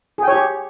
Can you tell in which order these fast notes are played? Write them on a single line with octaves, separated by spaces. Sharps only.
G#4 G5 C#5 G4